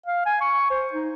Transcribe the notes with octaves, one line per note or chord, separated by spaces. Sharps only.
F5
G#5
C#6
C5
D#4